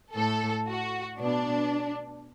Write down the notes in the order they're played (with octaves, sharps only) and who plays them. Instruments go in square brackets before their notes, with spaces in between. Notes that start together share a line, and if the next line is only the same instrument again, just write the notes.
[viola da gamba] A2 A3 [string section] A4
[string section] F#4
[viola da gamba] B2 B3 [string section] D4